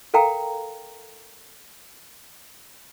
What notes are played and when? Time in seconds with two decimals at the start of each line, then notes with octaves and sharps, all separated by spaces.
0.14 A4 A#4 F5 G5 A#5